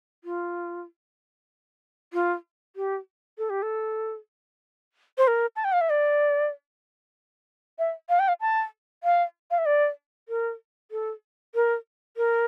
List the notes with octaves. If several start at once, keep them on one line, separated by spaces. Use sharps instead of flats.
F4
F4
G4
A4
G4
A4
C5
A#4
A5
G5
F5
E5
D5
E5
F5
G5
F5
A5
F5
F5
E5
D5
A#4
A4
A#4
A#4